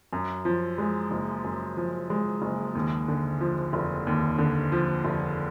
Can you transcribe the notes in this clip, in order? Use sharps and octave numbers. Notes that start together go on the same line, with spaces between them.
F#2
F3
G#3
F#1
F#2
F3
G#3
F#1
D#2
D3
F3
F1
D#2
D3
F3
F1